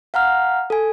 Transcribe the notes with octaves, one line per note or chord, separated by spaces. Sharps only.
F5 F#5 A#5 F6
A4 G#5